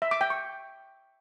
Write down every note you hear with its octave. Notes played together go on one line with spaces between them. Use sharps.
E5
D6
G5
C#6